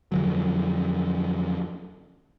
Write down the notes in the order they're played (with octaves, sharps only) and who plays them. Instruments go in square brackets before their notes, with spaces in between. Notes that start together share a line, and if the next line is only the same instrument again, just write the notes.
[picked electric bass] F2 D3 F#3